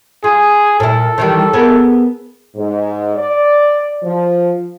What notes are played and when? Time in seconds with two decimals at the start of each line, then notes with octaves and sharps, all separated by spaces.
0.24 F4 G#4
0.80 A#2 E4 A4
1.18 D#3 E3 G3
1.53 B3 G#4 A#4
2.56 G#2
3.16 D5
4.02 F3